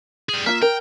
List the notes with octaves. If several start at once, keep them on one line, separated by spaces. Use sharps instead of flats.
G3 G#4
A#3 F4 E5
A#4 G5